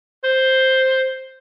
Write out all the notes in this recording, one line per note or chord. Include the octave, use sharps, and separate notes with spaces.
C5